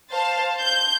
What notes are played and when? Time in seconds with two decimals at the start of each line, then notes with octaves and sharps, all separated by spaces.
0.11 C5 F5 A5
0.59 G6